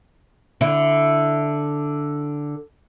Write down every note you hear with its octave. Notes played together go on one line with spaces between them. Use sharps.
D3 E4